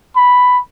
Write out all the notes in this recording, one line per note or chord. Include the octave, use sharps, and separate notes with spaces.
B5